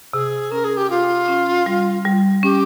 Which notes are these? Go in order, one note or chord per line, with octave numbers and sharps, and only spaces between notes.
C3 G#4
C#4 A#4
G#4
G4
C3 F4
C#4
G3
G3
C#4 G4